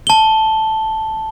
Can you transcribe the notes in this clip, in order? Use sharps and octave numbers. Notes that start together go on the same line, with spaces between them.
A5 G7